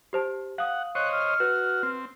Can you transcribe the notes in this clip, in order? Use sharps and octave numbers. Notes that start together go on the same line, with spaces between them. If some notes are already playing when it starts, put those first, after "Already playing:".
G4 C5 A5
F5 F#5 D#6
C5 C#5 D#5 F#6
F6
F#4 B4
C4